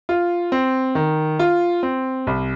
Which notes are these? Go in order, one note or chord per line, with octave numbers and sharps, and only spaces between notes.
F4
C4
D#3
F4
C4
C2